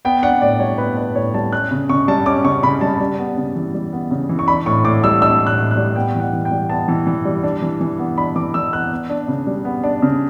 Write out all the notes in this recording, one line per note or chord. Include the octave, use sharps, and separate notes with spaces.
B3 G5
D4 F#5
A2 D5
G3 C#5
B3 B4
D4 B4
A2 C#5
G3 A5
C#4 F#6
C#3
C#3 C#6
G3 A5
C#4 D6
C#3 C#6
C#3 B5
G3 A5
G3
B3
C#3
E3
G3
B3
C#3
E3
C#6
D4 B5
A2 C#6
A2 D6
G3 E6
D4 E6
A2
F#6
A2
F#6
G3
B3 G5
E3
F#5
E3
G5
G3
B3 A5
E3
E3
G3
D4
E3
E3
B3
D4 B5
E3 D6
E3 E6
B3 F#6
B3
D4
C#3
G3
B3
D4
C#3